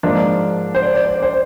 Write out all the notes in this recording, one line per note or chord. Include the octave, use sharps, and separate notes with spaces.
G#2 F3 A#3 D4
C5
D5
C5
D5
C5